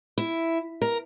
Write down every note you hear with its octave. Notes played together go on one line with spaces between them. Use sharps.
E4
A#4